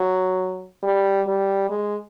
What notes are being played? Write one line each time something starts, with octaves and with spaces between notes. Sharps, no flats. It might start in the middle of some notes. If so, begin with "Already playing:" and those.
Already playing: F#3
G3
G3
G#3